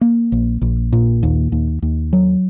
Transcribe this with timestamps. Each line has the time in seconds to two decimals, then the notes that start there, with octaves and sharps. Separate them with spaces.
0.01 A#3
0.32 A#1
0.62 A#1
0.93 A#2
1.23 D#2
1.52 D#2
1.82 D#2
2.13 F#3